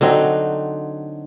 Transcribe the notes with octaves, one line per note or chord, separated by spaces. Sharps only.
D3 F#3 C4 D#4